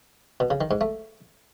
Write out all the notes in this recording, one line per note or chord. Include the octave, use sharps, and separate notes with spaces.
B2
C#3
D#3
G#2
A3